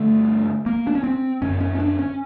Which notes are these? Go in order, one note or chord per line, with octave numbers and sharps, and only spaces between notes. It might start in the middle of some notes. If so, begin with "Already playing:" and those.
Already playing: G2 D3 A3
A#3
D4
C#4
C4
F#2 D3 C#4
C#4
C#4
D4
C#4